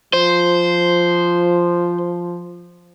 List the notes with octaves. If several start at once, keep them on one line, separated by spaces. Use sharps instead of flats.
F3 C5